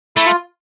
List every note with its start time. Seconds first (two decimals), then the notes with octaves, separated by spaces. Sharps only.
0.16 A3 E4
0.26 F4